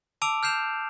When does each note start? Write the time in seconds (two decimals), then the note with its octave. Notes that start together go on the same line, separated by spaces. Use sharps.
0.22 A5 D6 E6 D7 F7
0.43 F6 G6 C7 E7 F7